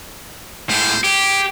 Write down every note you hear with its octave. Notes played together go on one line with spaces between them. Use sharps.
A2 G#3 C5
G4 G#4